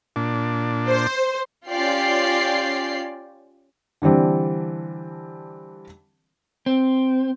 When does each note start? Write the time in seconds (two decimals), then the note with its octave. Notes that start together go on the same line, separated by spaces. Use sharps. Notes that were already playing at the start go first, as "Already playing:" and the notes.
0.16 A#2 D4
0.88 C5
1.70 C#4 F4 G4 D5 G5 C7
4.02 D3 E3 G3 C4 D4
6.66 C4